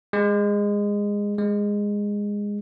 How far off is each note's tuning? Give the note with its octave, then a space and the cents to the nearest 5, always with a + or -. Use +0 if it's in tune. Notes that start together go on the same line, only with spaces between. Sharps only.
G#3 -20
G#3 -15